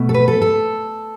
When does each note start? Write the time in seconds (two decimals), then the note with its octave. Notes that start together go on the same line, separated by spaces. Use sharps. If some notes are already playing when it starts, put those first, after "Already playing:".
Already playing: B2 A3
0.09 A4
0.14 B4
0.28 A4
0.42 A4